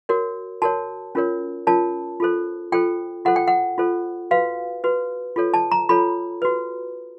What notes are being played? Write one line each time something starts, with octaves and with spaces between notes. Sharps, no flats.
F#4 A#4 C#5
F#4 A#4 C#5 A5
C#4 F4 A#4 C#5
C#4 F4 A#4 C#5 A5
F4 A4 C5
F4 A4 C5 G5
F4 A4 C5 F#5
G5
F#5
F4 A4 C5
F#4 B4 F5
F#4 B4
F4 A4 C#5
A5
A#5
F4 A4 C#5 B5
F#4 B4